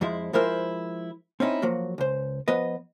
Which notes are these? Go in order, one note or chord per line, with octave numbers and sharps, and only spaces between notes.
F2 F3 G#3 E4
F3 G#3 E4 F4 A#4 C5
C4 C#4 D#4 E4
F3 F#3 A#3
C#2 C5
F3 B3 B4 D#5